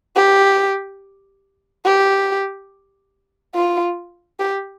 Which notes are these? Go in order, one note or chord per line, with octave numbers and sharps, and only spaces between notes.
G4
G4
F4
G4